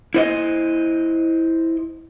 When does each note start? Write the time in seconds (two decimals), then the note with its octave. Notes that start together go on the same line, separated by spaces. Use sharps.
0.14 E4 C5 D#5